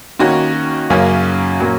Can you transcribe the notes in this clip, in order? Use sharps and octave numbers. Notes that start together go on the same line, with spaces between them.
D#3 A#3 C#4 F#4
F#2 C#3 A#3 C#4
A#2 F#3 A#3 C#4